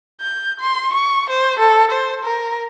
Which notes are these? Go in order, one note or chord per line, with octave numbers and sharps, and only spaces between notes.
G6
C6
C#6
C5
A4
C5
A#4